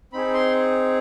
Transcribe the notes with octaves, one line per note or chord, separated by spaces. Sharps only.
C4 D#4 G#4 B5
C6